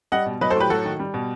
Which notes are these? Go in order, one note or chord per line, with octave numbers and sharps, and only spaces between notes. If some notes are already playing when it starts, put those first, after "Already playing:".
G3 D#5 F#5
B2
F#3 B4 D#5
A4 C5
A2 G4 B4
F#3 F#4 A4
D#3
G3
B2